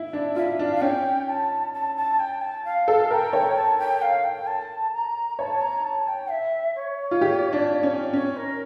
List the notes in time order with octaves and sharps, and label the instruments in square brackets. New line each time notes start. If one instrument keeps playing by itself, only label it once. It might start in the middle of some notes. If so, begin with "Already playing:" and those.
Already playing: [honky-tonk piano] E4
D4
[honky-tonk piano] F4 [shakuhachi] E5
[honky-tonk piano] D4 [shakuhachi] F5
[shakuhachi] F5
[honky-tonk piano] C#4 [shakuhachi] G5
[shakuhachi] A5
A5
A5
G5
A5
F5
[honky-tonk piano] A4
[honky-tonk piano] A#4 [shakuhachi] G5
[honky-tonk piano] C#5
[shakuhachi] A5
G5
F5
G5
A5
A#5
[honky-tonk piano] C#5 [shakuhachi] A5
[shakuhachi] A#5
A5
G5
E5
C#5
[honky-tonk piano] F4
G4
D4
C#4
[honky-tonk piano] C#4 [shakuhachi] C#5
[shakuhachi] A#4